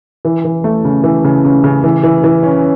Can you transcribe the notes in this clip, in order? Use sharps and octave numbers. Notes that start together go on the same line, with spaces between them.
E3
E3
A3
C#3
E3
C#3
C#3
C#3
E3
E3
E3
C#4